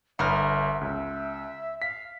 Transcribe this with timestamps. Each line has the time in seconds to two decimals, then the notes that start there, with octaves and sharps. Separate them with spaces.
0.19 G1 B3 A#4 E5
0.81 C#2 E5
1.82 F5 B6